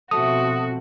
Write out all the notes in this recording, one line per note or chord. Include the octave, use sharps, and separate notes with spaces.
B2 F3 A3 C4 F#4 D#6